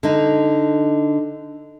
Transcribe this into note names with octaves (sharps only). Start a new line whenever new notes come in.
D3 D#4